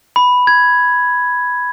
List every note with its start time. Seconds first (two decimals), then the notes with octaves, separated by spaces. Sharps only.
0.16 B5
0.47 G#6